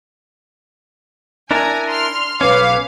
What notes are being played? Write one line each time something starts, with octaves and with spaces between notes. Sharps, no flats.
D4 E4 A#4 G#5 A#5
C6 F6
B1 C#4 B4 C#5 F5 D6